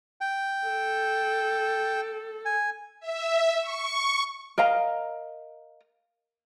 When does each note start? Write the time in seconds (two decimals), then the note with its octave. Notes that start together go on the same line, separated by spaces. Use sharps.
0.21 G5
0.67 A4
2.45 G#5
3.00 E5
3.61 C#6
4.58 A#4 D#5 F5 A#5